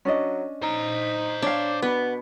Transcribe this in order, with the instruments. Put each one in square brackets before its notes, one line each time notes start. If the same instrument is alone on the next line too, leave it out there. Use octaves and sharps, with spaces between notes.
[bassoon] F#3 [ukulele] C#4 D4 D#5
[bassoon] D#4 [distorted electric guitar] C5 A#5
[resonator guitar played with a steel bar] D4 [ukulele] C#5 F5
[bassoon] B2 [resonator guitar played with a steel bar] B3 [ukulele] B4